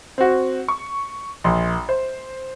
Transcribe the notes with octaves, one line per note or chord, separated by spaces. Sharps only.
C4 F#4
C#6
A#1 C6
C5